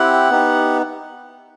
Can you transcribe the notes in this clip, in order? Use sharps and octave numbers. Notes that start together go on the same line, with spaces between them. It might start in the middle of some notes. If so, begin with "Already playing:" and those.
Already playing: C4 E4 G4 F#5
B3 D#4 G4